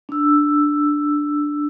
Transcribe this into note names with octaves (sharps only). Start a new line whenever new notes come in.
D4 E6